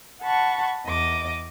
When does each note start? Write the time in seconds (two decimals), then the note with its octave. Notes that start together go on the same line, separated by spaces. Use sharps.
0.23 F#5 A5 B5 C#6
0.88 E2 D#5 D6